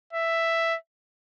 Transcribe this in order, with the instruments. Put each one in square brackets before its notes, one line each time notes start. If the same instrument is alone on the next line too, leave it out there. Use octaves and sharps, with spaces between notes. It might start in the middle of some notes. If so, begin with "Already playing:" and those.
[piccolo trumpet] E5